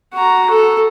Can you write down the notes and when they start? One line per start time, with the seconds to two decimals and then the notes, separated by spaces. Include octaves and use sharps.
0.13 F#4 A#5
0.50 A4